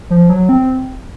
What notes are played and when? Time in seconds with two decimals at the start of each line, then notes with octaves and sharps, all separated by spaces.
0.10 F3
0.30 F#3
0.49 C4